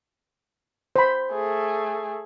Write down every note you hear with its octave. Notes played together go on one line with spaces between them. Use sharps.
C5 B5
A3 G#4